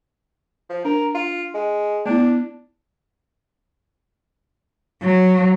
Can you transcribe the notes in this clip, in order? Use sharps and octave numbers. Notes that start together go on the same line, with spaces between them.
F3
D4 A#4
F4
G#3
A3 B3 D4 E4
F#3